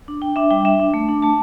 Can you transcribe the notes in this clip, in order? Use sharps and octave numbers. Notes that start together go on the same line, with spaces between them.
D4
D4 G5
D4 E5
G3 G5
D4 E5
D4
A3
D4
A3 A5